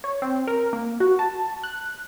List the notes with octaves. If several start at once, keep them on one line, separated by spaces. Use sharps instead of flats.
C#5
C4
A#4
A#3
F#4
A5
F#6